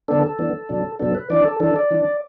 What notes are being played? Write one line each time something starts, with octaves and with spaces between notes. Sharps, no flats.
D3 B3 D4 A4
A4
E3 B3 D4
B2 F#3 D4
B2 F#3 B3 D4 A4
B4
E3 D4 D5
A4
E3 D4 A4
D5
E3 D4